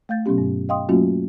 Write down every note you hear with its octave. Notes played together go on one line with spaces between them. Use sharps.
A3 F5 G6 A6
B2 F#3 B3 C#4 G4
G2
D#5 F5 G5 C6 D#6
F#3 A3 A#3 C#4 F4 F#4